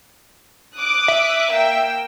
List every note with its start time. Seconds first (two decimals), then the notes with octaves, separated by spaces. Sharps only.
0.75 D6 D#6 F#6
1.08 E5
1.52 A#3 G5 E6